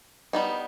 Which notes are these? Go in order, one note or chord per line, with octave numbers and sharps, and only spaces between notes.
G3 B3 D#4